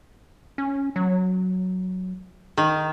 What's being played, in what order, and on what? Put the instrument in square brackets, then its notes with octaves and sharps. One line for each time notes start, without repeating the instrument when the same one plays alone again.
[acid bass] C#4
F#3
[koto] D#3